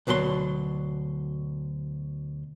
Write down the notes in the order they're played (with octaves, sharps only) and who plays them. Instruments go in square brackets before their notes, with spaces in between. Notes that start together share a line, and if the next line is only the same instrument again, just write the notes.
[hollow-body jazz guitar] D2 B2 F#3 A#4 C6